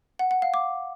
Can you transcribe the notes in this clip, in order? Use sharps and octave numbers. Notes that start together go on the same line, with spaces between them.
F#5
F#5
F5
D6